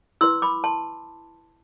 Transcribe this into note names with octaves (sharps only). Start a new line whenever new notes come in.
E4 B4 C6 E6
B5 D6
A5 C6